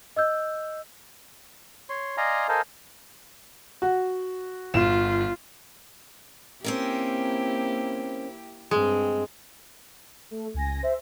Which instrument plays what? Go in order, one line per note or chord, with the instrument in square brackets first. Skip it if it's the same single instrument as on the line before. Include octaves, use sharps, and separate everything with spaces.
[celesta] D#5 E6 G6
[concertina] C#5 C6
D5 D#5 F5 G#5 A#5 C6
A4 A#4 C5 D#5 F5 G#5
[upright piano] F#4
[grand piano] G1 E7 [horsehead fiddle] F4
[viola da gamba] A#3 E4 G4 [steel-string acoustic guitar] C4 C#4 A#4
[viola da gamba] G2 C4 [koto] G#3
[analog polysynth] A3
C#2 G#5 A#6
C5 E5